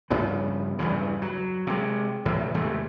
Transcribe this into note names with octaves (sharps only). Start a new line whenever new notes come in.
G2 C#3 F3 B3
E2 G2 C#3 E3
F#3
C3 G#3
E2 A2 C3
D#2 C3 G#3 A3